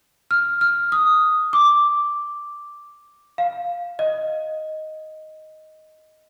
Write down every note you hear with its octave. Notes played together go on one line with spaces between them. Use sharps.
F6
F6
D#6
D6
F5
D#5